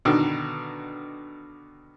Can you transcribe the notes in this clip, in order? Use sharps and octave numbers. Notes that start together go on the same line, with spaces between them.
B2 D3 D#3